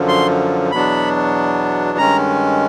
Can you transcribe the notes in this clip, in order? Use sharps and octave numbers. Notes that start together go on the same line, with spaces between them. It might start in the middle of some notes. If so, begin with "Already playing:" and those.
Already playing: F#2 D3 F3
C6
E2 B2 F#3 B3 D4 B5
G2 D#3 G#3 C#4 A#5